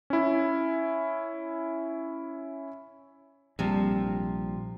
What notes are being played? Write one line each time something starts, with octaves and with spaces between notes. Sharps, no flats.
C#4 E4
A#1 C3 F3 G3